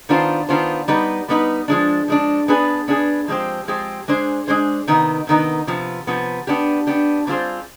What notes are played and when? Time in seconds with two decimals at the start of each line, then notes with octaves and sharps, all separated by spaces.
0.09 D#3 B3 D4 F4 C5
0.49 D#3 B3 D4 F4 C5
0.88 G3 B3 D#4 B4
1.28 G3 B3 D#4 B4
1.68 F3 G#3 D4
2.08 F3 G#3 D4
2.48 B3 D4 G#4 B4
2.88 B3 D4 G#4 B4
3.28 F3 G#3 C4 G4 C5
3.68 F3 G#3 C4 G4 C5
4.08 G#3 D4 G#4 C5
4.48 G#3 D4 G#4 C5
4.88 C3 D#3 B3 D#4
5.27 C3 D#3 B3 D#4
5.67 C3 F3 B3
6.07 C3 F3 B3
6.47 B3 D4 G4
6.87 B3 D4 G4
7.27 G3 C4 F4 G#4 C5